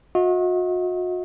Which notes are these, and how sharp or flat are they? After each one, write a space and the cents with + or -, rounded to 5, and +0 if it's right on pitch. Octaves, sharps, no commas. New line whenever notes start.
F#4 -40 D#5 +40